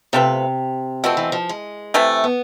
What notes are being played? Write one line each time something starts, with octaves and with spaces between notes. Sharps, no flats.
C3 A3 C4 F4 B4
B2 F3 A3 C4
E3
F3
G#3
C3 E3 A3
B3